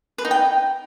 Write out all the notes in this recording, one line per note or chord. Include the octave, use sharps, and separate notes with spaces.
B4
D#4
G5